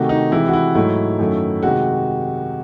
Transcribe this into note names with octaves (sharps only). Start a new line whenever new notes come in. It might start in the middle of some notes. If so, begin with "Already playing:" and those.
Already playing: C3 D#3 A3 F#4
D#4
C3 E3 G#3 E4
F#4
E4
G#2 F#3 A3 E4
F#2 D#3 F#3 A3
C3 D#3 G#3 F#4